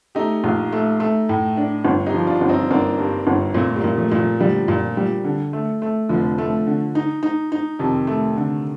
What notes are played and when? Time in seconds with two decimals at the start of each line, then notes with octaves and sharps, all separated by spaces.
0.15 A3 D#4 G4
0.44 A#1
0.72 A3
1.00 A3
1.29 A2
1.57 D4
1.85 G1
2.06 D#4 G4
2.14 F3
2.27 D4 F4
2.41 G1
2.49 C4 D#4
2.70 G1 A#3 D4
2.98 G2
3.27 G1
3.54 A#2 A3 C4
3.76 G3 A#3
3.84 A#2
3.97 F3 A3
4.12 A#2
4.18 F3 A3
4.40 D3 F3 G3
4.68 A#2
4.97 G3
5.25 D3
5.53 A3
5.82 A3
6.09 F1 D3 F3
6.38 A3
6.67 D3
6.95 D#4
7.23 D#4
7.52 D#4
7.79 F2 C3 D#3
8.07 A3
8.36 D3